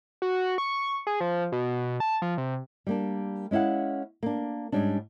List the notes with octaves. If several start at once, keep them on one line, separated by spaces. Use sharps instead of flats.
F#4
C#6
G#4
F3
B2
A5
F3
C3
G3 A#3 D4
G#3 C#4 E4 F5 F#5
A#3 D4
G#2 G3 C#4 D4